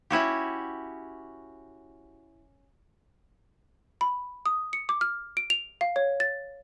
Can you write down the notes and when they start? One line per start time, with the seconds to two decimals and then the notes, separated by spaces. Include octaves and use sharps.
0.10 C#4 E4 F#4 G4
4.01 B5
4.46 D#6
4.73 C#7
4.89 D6
5.01 F6
5.37 D7
5.50 F7
5.81 F5
5.96 C#5
6.20 A6